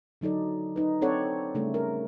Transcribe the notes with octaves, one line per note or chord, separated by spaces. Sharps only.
D3 F#3 D#4 A4 D5
D#4 B4
C4 D4 A4 C#5 D5 F#5
C#3 G3 A3 D4
A#4